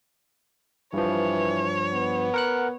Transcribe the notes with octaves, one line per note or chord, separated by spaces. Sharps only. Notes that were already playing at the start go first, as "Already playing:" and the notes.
G2 E3 F3 C#5
B3
A#4 F#5 F#6